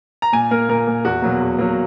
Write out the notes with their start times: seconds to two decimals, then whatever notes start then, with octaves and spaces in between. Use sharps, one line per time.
0.22 A#5
0.33 A#2 G#5
0.51 A#3 A#4
0.69 A#2 A#4
0.87 A#3
1.05 E2 F#4
1.22 B2 F#3 A#3
1.41 E2
1.59 B2 F#3 A#3